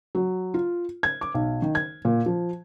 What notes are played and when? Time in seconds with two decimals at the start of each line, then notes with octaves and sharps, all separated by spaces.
0.15 F#3
0.54 F4
1.03 G#6
1.21 D6
1.34 B1
1.62 D#3
1.75 G#6
2.05 A#2
2.26 F3